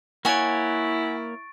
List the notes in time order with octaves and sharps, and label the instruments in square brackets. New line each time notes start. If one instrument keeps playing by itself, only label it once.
[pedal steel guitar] A#3 C#5 [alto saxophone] E4 [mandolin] F#4 G#5 [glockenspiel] C#6 A6 D7